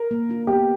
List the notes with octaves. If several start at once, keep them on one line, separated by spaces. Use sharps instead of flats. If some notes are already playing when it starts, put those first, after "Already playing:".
Already playing: A#4
A#3
D4 F4
B3 G4